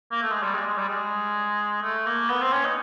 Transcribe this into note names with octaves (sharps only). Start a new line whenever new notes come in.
A#3
A3
G#3
G3
G#3
G#3
G3
G#3
A3
A#3
B3
C4
C#4
D#4